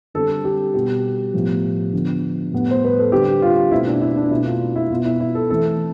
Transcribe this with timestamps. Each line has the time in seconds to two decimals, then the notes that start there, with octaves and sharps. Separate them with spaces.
0.14 D3 G3 C4 A4
0.44 G4
0.74 B2 G3 B3 G4
1.34 A2 F3 B3
1.93 D3 F3 B3
2.52 A2 G3 B3
2.71 C5
2.85 B4
2.99 A4
3.12 D3 G3 C4 G4
3.42 F4
3.71 B2 A3 C4 E4
3.87 D4
4.01 E4
4.16 D4
4.31 B2 A3 C4 E4
4.45 F4
4.76 E4
4.90 B2 B3 F4
5.05 E4
5.20 E4
5.35 A4
5.50 E3 A3 C4 A4